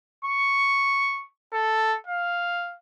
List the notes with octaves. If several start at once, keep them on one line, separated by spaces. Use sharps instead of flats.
C#6
A4
F5